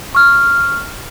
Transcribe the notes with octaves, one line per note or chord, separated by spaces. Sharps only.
C#6 F6